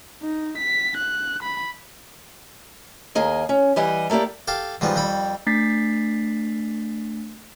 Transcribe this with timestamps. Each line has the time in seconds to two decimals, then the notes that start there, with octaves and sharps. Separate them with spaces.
0.22 D#4
0.58 B6
0.97 F#6
1.43 B5
3.15 D#2 A#3 G#4 D#5
3.49 C#4
3.76 E3 G3 G4 D#5 F#5 G#5
4.10 A3 A#3 E4 G4 D5
4.48 G4 A4 F5
4.81 G#2 F3 G3 B3
4.96 F2 G3 B5
5.46 A3 D4 A6 B6 C7